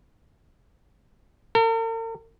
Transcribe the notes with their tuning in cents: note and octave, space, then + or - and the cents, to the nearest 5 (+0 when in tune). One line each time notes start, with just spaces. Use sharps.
A#4 -45